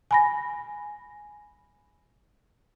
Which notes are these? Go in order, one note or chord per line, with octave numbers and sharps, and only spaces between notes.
G#5 B5 A#6